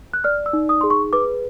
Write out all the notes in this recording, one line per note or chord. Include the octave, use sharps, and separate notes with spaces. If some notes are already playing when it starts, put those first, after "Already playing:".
F#6
D5 F6
E6
D#4
D#6
G#4 C6
C#6
B4 D6